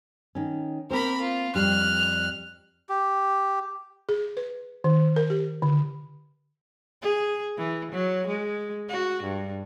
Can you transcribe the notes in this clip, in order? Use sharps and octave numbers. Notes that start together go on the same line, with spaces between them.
D#3 C#4
A#3 C4 A#4 C5 B5
F4
F2 G3 D4 F6 F#6
G4
G#4
B4
D#3
A#4
G4
D3
G#4
E3
F#3
G#3
F#4
G2